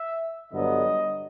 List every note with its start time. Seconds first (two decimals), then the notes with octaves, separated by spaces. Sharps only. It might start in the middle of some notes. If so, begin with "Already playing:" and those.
Already playing: E5
0.52 G1 G2 D3 F#3 B3 D#5